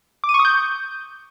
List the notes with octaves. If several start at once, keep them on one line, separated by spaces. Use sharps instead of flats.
D6
D#7
C#6
D#6
G6